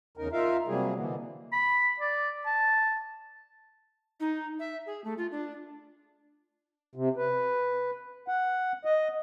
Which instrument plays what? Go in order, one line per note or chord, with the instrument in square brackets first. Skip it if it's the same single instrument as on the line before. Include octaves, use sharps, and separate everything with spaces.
[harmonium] E2 C#3 D#4 A#4
D#4 F4 A#4 E5 F5
C3 F#3 G3 A#3 G#4
B2 D3 E3 A#3 B3
[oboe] B5
D5
A5
[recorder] D#4
E5
G#4
A3
F4
D4
[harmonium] C3
B4
F#5
D#5